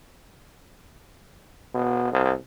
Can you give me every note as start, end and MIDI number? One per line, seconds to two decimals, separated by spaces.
1.75 2.07 47
2.12 2.34 36